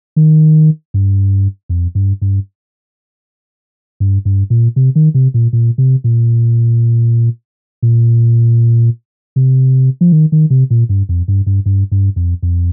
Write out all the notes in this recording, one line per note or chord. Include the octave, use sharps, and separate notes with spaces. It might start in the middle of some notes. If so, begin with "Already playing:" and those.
D#3
G2
F2
G2
G2
G2
G2
A#2
C3
D#3
C3
A#2
A#2
C3
A#2
A#2
C3
F3
D#3
D#3
C3
A#2
G2
F2
G2
G2
G2
G2
F2
F2